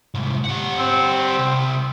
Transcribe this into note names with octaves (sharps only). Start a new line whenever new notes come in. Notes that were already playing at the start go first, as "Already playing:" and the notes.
C2 G#2
G3 F#5
C4
C2